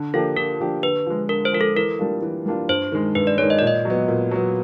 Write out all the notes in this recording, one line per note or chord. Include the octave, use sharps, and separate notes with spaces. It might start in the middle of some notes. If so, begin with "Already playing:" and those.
Already playing: D3
F3 A#3 D4 G4 A4
D3 A#4
F3 A#3 D4 G4
D3 B4
F3 G#3
D3 A#4
C5
F3 G#3 A#4
A4
E3 A#4
G3 A#3 D4 F4
E3
G3 A#3 D4 F4
G2 C5
D#3 G#3
G2 B4
D5
D#3 G#3 C#5
D#5
A#2 D5
D#5
F#3 B3
A#2
F#3 B3